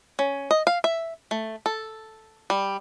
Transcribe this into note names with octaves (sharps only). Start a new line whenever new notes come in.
C#4
D#5
F5
E5
A3
A4
G3